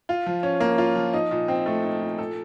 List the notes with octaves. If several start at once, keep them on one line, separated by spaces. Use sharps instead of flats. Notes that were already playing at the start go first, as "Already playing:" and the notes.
F4
F3
C#4
A#3
F4
F3
D#4
A#2
C4
A3
D#4
A#2
A4